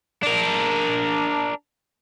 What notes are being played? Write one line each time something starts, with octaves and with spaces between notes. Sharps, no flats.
D4 A#4